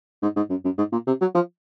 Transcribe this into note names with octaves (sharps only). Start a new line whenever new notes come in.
G#2
G#2
F#2
F#2
G#2
A#2
C3
F#3
F3